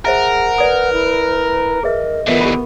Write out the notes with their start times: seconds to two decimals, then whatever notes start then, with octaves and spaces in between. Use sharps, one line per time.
0.05 G#4 A#4 C5 E5 F#5 A5
0.58 B4 D5 D#6
0.92 E4
1.83 G#4 A#4 B4 D#5 E5
2.27 D3 E3 B3 F4 A#4 E5
2.41 G4 B5